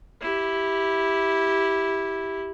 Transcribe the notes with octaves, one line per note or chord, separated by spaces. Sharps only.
E4 G4